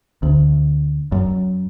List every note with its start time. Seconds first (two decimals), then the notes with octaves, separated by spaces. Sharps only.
0.23 D2
1.12 F#2